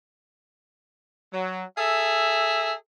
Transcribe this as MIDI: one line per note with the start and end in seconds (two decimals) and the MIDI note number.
1.32 1.63 54
1.78 2.74 68
1.78 2.74 69
1.78 2.74 76